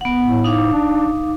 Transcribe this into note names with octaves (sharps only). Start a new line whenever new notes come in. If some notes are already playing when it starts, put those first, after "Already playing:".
B3 F#5
A2
D#4 F5 D6
D4